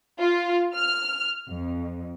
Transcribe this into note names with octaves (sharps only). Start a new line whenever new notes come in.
F4
F6
F2